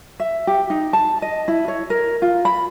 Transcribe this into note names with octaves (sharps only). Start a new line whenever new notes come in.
E5
G4
D#4
A5
D#5
E4
C#5
A#4
F4
B5